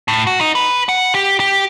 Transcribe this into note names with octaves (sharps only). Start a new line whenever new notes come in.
A2
F#4
D#4
B4
F#5
G4
G4